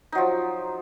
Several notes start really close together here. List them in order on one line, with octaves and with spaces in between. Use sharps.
D#4 F#3 F3